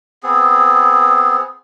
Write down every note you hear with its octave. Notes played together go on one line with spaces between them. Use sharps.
B3 C4 G#4